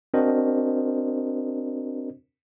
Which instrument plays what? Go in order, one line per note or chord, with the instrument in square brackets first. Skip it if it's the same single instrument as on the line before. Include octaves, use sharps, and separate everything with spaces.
[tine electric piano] C4 D4 F#4 A#4 C5 D#5